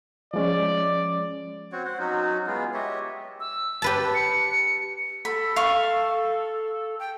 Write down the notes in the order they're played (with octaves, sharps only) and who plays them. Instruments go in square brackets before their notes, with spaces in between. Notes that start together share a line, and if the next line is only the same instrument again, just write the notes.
[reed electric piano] F3 G#3 C#4 [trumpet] D5
[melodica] C4 F#4 C#5
C5 F#5
F#3 C#4 D#4 F#4
G#3 B3 F4
G4 C#5 D#5 E5
[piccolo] E6
[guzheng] G4 B4 A5
[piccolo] C#7
[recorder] A4 [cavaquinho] B5
[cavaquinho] F5 C#6
[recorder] G5